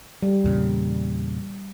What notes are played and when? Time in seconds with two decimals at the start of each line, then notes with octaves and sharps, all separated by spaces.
0.23 G3
0.44 E2 A#2 C#3